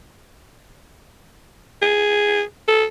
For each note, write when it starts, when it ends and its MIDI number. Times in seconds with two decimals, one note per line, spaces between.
1.82 2.43 68
2.68 2.85 69